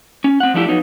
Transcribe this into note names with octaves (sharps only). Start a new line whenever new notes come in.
C#4
C4 F#5
F3 G3 A3 D4 E4 G4
F3 F#3 B3 D#4